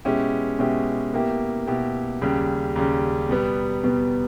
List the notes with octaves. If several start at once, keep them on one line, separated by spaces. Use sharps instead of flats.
B2 G#3 C#4 E4 G4
B2 G#3 C#4 E4 G4
B2 A#3 E4 G4
B2 A#3 E4 G4
D#2 C#3 G3
D#2 C#3 G3
B2 G3 B3
B2 G3 B3